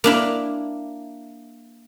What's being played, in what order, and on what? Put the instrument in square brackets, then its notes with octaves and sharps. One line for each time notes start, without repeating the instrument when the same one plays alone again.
[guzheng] A#3 D4 E4